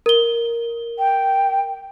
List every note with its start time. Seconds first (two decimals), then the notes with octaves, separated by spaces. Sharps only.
0.06 A#4 G7
0.99 G5